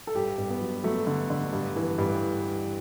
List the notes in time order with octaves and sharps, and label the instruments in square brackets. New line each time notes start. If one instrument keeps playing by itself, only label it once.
[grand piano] A4
G2 G4
G2
B3
F#3
F#3 A3
D3
D3
G2
E3
G2